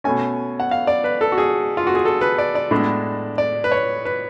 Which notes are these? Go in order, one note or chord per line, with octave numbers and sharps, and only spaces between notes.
B2 A3 C#4 G#5
F#5
F5
D5
B4
A4
F#4
G#4
F4
F#4
G#4
A4
B4
D5
D5
A2 G#3 B3 D4
D5
B4
C#5
B4